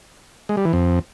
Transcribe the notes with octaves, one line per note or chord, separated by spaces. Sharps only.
G#3
G3
E3
F2